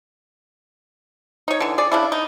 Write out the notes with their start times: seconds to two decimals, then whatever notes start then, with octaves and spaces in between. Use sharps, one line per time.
1.48 D#4 C#5
1.60 D3 E3
1.78 G#4 D5
1.92 C#3 D4 E4
2.12 D#4